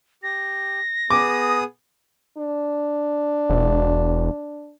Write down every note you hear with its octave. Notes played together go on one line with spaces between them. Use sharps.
G4 A#6
B3 G#4 D6 D#6
D4
E1